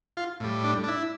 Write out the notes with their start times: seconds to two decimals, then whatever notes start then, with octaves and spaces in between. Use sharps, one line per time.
0.17 F4
0.40 A2 G3
0.64 D4
0.84 D4
0.88 E4